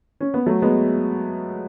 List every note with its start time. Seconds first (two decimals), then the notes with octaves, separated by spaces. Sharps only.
0.20 C#4
0.34 B3
0.46 F#3 A3
0.62 G#3 B3